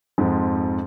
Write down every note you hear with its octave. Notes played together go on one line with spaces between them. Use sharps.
F2 G#2 F3